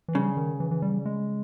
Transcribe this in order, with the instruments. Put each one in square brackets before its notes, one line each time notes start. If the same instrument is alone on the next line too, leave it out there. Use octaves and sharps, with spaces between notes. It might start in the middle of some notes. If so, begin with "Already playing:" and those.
[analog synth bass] E3
[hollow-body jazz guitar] C#3 [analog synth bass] G3
[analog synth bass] D#3
E3
E3
G3
G#3